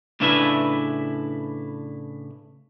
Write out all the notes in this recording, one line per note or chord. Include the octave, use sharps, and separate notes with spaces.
A2 C#3 D4 E4 B4 E5